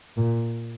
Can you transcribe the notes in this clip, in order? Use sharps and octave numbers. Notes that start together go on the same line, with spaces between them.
A#2